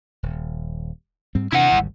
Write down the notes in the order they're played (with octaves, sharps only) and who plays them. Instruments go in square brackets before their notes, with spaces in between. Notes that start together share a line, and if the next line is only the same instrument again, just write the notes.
[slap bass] D#1
G#2 G3 C4
[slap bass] C3 C4 D4 [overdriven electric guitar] E4 F#5
[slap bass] G#1 D2 G3